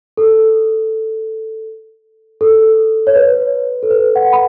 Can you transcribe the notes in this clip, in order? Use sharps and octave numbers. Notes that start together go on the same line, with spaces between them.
A4
A4
C#5
B4
A4
B4
F#5
B5